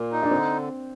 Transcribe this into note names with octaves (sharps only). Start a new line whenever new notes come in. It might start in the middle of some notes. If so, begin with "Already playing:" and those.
Already playing: A#2 A#3
D#4
D4
D3 C4